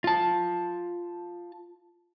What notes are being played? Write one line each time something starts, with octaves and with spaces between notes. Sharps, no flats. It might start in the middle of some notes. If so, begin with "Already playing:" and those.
F4 A5